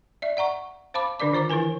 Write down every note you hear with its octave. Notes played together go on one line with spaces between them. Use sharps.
D5 E5
D5 F#5 A#5 C#6
C5 F5 A5 B5 D6
D3 D4 A#4 D5 D6
D#3 F4 C5 A#5 D6
E3 E4 A#4 B4 G#5